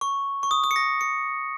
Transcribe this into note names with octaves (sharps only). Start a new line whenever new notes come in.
C#6
C#6
D#6
D#6
C#7
A#6
C#7